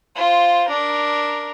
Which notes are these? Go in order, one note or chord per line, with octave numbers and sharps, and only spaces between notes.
F4 C5
D4 A#4